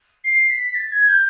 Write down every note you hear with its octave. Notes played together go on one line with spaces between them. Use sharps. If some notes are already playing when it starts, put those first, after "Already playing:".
C7
B6
A6
G#6
G6